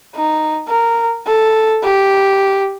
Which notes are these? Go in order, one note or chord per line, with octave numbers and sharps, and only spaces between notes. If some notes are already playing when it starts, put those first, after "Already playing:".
D#4
A#4
A4
G4